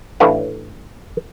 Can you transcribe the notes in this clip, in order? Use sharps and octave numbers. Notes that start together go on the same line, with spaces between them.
A1 A2 A3 D4 B4 F5